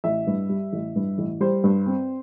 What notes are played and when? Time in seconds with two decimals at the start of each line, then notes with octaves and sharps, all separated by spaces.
0.04 A1 E5
0.27 G2
0.49 G3
0.73 A1
0.96 G2
1.18 A1
1.41 G3 C5
1.64 G2
1.86 C4